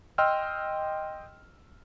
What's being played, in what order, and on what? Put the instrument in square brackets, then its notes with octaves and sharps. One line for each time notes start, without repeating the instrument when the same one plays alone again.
[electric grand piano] D#5 G5 C6 E6 F6